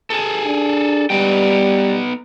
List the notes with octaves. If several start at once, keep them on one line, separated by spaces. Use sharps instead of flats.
G#4 A4
D4
G3 B3 D#4 G5